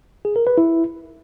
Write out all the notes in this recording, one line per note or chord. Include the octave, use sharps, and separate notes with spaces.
G#4
A#4
B4
E4